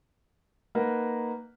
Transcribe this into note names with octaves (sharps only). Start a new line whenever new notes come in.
A#3 D#4 A#4 B4 F#5